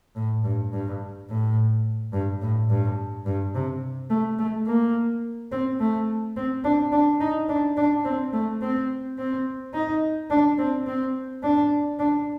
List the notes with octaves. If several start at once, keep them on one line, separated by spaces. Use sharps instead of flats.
A2
G2
G2
A2
G2
A2
G2
G2
C3
A3
A3
A#3
C4
A3
C4
D4
D4
D#4
D4
D4
C4
A3
C4
C4
D#4
D4
C4
C4
D4
D4